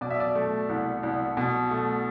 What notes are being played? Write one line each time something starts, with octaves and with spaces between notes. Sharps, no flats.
B2 D5
E5
D5
A3
C2
C2
B2
A3